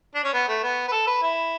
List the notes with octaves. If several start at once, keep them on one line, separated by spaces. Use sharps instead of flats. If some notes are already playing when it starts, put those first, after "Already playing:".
D4
C#4
B3
A3
B3
B4
A4
B4
E4